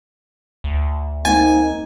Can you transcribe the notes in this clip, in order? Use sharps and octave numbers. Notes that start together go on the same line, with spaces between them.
D2
A#3 C4 D#4 G#5